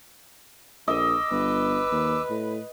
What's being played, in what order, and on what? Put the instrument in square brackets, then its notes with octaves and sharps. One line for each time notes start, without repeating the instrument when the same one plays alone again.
[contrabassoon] A#1 [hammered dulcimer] D#5 [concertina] D6 E6
[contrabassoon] G1 [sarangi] B4
[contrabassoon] D#2
A2